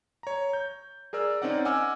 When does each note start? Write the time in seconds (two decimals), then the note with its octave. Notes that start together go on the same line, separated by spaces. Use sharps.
0.23 C#5 A#5
0.53 G6
1.13 G#4 A#4 D5 E6
1.42 C4 C#4 D#4 D5 F#5
1.65 D#5 F#5 G#5 D6 E6 F6